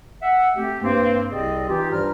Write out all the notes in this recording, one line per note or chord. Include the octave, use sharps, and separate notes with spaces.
E5 F#5
A3 C4 G4
G2 A#3 C4
C2 C3 C4 G#4 D5 D#5
E3 D#4 F4 G4
G2 F3 G3 F4 A#5 F6